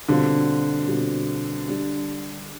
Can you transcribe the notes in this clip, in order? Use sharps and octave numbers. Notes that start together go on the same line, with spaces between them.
B2 D3 G3 C4 F4
B2 G3 C4 F4
G3 D4 G4